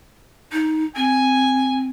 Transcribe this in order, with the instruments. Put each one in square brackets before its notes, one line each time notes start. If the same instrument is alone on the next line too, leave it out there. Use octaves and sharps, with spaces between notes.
[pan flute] D#4
[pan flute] C4 [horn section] G#5